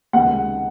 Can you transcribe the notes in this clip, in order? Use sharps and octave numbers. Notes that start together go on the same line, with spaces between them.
C#2 C3 D#3 G#3 F#5